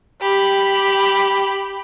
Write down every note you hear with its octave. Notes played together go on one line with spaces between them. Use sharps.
G4 B5